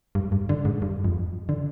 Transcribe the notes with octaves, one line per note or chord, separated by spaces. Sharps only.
G2
G2
D3
G#2
G2
F2
D3